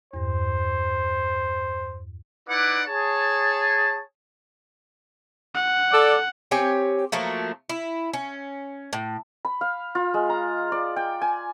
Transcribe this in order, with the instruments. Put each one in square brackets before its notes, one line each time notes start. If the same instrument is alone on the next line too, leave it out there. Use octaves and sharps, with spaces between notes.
[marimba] E2 G2 [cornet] C5
[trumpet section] D#4 E4 B4 D5 F#5 D6
G#4 C#5 A5
[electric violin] F#5
[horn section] A4 D5
[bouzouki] C4 G4 C#5 G#5
F3 F#3 A3 A#3
E4
C#4
A2
[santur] B5
F5
F4
G#3
A#5
D5
G5
G#5